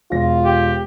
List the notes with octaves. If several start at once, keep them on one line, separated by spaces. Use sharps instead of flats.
E1 F4 A#6
G4